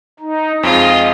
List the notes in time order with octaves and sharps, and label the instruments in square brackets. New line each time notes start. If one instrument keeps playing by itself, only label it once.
[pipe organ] D#4
[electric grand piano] F2 [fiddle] G#3 F4 [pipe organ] D#5